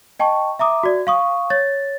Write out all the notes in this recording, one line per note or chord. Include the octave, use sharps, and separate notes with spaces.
D#5 G5 A5 C#6
E5 A#5 D6 D#6
F#4 D5
F5 C#6 D#6
C#5 A6